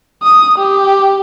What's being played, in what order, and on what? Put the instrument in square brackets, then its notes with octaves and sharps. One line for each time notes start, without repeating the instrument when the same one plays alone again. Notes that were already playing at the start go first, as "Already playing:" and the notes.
[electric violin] D#6
G4